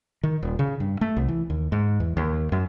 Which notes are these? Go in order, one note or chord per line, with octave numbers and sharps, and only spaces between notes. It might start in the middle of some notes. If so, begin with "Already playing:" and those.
D#3
D#1
C#3
G2
A3
C2
E3
D#2
G#2
E2
D#2
F#2